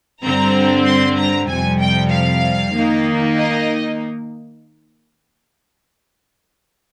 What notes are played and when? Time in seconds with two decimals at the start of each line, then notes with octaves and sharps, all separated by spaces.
0.23 G2 D3 G3 C4 A#5
0.86 C6
1.18 A#5
1.49 F2 C3 G3 G#5
1.80 G5
2.11 F5
2.75 D#3 A#3 D#4
3.37 D#5